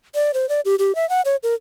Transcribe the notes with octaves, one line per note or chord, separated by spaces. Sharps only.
D5
C5
D5
G4
G4
E5
F#5
C#5
A#4